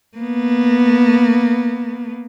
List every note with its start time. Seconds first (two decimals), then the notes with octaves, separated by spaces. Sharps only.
0.18 A#3 B3